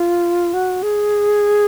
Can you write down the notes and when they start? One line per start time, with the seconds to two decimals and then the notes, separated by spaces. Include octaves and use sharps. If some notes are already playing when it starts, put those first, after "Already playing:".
Already playing: F4
0.53 F#4
0.83 G#4